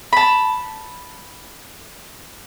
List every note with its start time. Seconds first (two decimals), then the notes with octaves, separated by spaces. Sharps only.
0.13 A5 B5